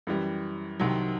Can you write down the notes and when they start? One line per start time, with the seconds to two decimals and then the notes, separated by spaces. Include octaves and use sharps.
0.07 F#2 E3 G3
0.80 C2 C3 D#3 F#3